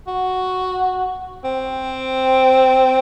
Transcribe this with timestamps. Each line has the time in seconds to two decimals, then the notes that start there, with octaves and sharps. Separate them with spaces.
0.07 F#4
1.44 C4